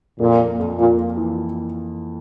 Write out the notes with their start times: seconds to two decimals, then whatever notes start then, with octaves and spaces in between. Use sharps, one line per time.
0.19 F2 A#2
0.39 A#3
0.59 F2
0.78 A#2 A#3
0.98 A#3
1.17 E3